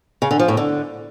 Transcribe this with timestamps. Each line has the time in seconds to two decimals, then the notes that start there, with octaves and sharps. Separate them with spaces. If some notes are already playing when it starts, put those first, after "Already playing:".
0.22 C#3
0.31 D3
0.39 F3
0.48 A2
0.57 D3